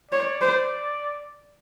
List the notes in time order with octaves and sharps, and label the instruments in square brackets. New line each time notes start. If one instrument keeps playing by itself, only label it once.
[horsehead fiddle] C#5 [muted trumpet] D5
[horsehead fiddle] C5